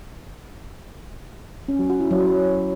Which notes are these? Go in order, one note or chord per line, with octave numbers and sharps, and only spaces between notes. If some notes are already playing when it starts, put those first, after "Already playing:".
C#4
F#3
F#4
E4
F#3